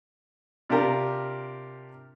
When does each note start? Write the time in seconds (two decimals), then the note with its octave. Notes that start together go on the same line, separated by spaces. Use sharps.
0.70 C3 D4 F4 G4 A#4